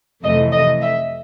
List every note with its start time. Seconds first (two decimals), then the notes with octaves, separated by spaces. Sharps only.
0.24 F2 C3 E3 A3 D#5
0.53 D#5
0.81 E5